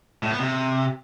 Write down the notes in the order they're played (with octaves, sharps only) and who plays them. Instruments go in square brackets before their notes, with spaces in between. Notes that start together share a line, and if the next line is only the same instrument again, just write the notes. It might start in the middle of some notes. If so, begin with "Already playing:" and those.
[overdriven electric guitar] A2
B3
C3